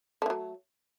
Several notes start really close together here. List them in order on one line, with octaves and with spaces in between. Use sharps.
A3 E3 F#3